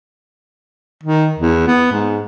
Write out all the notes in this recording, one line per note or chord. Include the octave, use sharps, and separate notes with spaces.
D#3
E2
B3
G#2